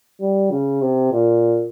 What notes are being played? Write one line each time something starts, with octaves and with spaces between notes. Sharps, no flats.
G3
C#3
C3
A#2